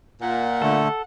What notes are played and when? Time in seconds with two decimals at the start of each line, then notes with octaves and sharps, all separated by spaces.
0.21 A#2 F#5
0.62 D3 A3 A4